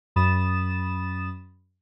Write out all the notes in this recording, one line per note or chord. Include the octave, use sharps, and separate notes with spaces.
F#2 B5 D#6 A6 E7